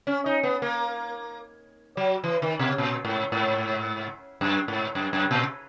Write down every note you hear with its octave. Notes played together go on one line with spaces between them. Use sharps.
C#4
D#4
B3
A#3
F#3
E3
D#3
B2
A#2
G#2
G#2
F#2
G#2
F#2
F#2
A#2